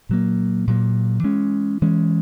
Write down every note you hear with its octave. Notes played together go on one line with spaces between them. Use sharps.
A#2 F#3 A#3
A#2 F#3 A#3
E3 G#3 C#4
E3 G#3 C#4